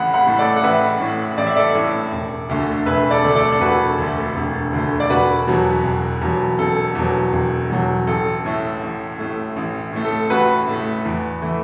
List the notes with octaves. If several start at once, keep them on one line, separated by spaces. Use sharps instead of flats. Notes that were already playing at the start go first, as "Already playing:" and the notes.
Already playing: A1 A2 A3 F#5 B5
F#5 B5
A2 A3
A4 D5
F#5
A1 B4 E5
A2 A3
A1 D5
E5
A4 D5
A2 A3
E1
D2 D3 A3
E1 B4 E5
A4 D5
D2 D3 A3
A4 D5
A4
E1 F#4 B4
D2 D3 A3
E1
D2 D3 A3
D5
E1 F#4 B4
E2 B2 F#3
E1
E2 B2 F#3
E1 A4
E2 B2 F#3
E1
E2 B2 F#3
A1 A4
A2 A3
A1
A2 A3
A1
A2 A3
A4
A1 F#4 B4
A2 A3
E2
E3 A3